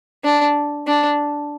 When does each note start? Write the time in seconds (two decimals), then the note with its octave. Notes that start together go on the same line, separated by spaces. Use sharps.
0.24 D4
0.87 D4